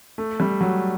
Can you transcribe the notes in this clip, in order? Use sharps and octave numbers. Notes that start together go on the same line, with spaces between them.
A3
G3
F#3